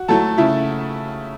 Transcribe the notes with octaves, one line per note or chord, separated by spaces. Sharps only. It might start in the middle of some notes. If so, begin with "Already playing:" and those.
Already playing: F#4
F#3 A3 E4 A4 A5
C#3 E4 E5